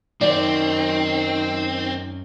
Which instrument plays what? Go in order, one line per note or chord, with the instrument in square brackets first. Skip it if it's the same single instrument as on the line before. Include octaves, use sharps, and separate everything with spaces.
[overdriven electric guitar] F#2 [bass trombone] D#3 [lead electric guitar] C4 [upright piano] D5